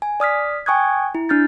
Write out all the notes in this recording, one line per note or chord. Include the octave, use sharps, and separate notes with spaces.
G#5
D5 D#6 F6 B6
G5 G#5 C#6 D#6 F#6 G#6
E4
D4 F6 G6 A6